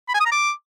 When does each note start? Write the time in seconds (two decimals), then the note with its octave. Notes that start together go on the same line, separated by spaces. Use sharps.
0.09 B5
0.14 G#5
0.20 D#6
0.26 A#5
0.32 D6